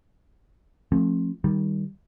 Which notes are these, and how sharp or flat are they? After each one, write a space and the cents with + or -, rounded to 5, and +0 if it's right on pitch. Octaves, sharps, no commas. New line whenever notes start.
F3 +0 A3 +0 C#4 -45
D#3 +0 G3 +0